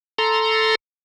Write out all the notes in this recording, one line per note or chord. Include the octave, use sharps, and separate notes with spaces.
A4 A#5 C6